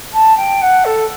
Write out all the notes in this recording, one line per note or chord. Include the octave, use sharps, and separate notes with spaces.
A5
G5
F#5
A4